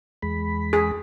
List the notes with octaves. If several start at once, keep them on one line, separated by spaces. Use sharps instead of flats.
E2 G#3 B5
G#4